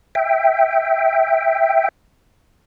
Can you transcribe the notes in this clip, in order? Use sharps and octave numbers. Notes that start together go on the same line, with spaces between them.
E5 G5